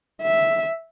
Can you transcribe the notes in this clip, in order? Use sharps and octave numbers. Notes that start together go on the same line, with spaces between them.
E5